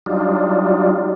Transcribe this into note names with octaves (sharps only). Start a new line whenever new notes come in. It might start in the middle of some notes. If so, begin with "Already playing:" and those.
F#3 G3 D4 D#4 F4